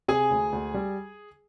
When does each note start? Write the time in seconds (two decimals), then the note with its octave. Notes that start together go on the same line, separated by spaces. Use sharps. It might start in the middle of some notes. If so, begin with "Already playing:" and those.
0.08 C3 G#4 G#5
0.30 D2
0.52 D2
0.74 G3